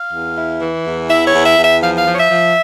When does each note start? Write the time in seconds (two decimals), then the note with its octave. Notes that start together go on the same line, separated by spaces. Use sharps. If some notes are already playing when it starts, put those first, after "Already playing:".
Already playing: F5
0.11 E2
0.36 E4
0.60 E3
0.84 E2
1.08 E4 E5
1.26 C#5
1.33 E2
1.45 E5
1.57 E2
1.63 E5
1.81 F3 F5
1.97 F5
2.06 F3
2.12 C#5
2.18 E5
2.30 F3